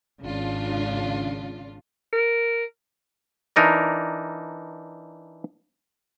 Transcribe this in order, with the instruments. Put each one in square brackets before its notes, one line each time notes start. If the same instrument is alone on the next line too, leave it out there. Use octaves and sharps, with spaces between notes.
[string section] G#1 C#3 D4 F4
[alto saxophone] A#4
[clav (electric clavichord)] E3 D4 D#4 A#4 D5